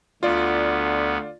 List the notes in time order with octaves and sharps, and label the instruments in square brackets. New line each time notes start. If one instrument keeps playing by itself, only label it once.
[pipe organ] D2 B3 [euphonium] D3 [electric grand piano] F4 D5